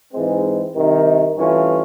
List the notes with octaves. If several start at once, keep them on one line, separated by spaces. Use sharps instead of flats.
G#2 E3 G#3 C4
C2 C3 D#3
G2 E3 A3 C#4 F4